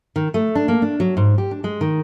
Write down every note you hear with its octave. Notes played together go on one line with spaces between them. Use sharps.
D#3
A3
D4
A#3
D4
F#3
G#2
G4
D4
G#3
D#3